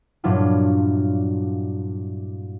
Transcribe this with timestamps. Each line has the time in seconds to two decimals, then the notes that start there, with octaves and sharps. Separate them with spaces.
0.24 G2 A#2 F#3 D4 E4 F4